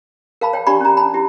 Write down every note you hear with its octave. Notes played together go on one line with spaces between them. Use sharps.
A#4 F5 A5 B5
C#5 G5
D4 G4 D5 A5 B5 C#6
C#4 A#5
A5 B5
E4 G4